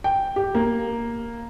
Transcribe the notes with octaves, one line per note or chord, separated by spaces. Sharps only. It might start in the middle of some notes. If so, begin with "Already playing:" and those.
G5
G4
A#3